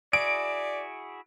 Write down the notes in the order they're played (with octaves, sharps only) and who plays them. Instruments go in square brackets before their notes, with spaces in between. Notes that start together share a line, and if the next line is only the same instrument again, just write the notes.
[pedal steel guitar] E4 F#4 G#4 [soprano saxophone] D5 [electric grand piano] D7